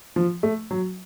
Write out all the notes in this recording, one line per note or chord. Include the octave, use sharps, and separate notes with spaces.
F3
A3
F#3